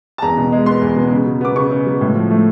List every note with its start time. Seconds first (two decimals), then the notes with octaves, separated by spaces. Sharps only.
0.18 A5
0.22 E2 A#5
0.37 B2
0.52 G#3
0.66 B3 C6
0.82 E2
0.96 B2
1.11 C#3
1.26 F#3
1.41 B3 D6
1.56 C#3 C#6
1.71 C#3
1.86 F#3
2.01 A2
2.15 F3
2.30 A3